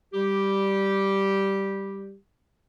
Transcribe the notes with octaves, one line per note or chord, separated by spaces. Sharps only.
G3 G4